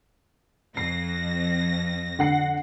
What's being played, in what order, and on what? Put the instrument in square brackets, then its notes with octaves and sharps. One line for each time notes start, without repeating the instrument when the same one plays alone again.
[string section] F2 A#6 [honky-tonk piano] C7
[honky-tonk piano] D3 F#5 C7